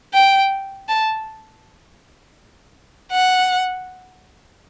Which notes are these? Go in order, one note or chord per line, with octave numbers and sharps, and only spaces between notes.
G5
A5
F#5